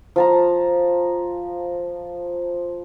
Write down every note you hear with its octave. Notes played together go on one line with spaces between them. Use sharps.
F3 A5 A#5